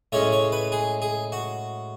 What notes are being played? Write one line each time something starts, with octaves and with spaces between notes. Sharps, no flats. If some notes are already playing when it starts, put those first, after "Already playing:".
A2 G#3 C#4 C#5
C#5
B4
G#4
G#4
F#4